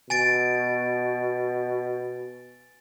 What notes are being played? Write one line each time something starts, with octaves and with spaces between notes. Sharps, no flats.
B2 G#5 A6 D7